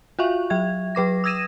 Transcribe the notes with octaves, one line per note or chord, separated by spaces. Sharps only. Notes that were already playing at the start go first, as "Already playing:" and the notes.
F4 F#4 E5 F5 C#6
F#3 E5 G#6
F#3 B4 D6 A#6
D#6 E6 G#6 A#6 D#7 E7